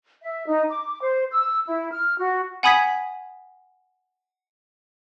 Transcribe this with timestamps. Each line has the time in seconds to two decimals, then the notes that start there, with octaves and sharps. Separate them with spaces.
0.23 E5
0.48 D#4
0.71 D6
1.01 C5
1.32 E6
1.67 E4
1.93 F6
2.19 F#4
2.63 F#5 G#5 B5 D#6 G#6 B6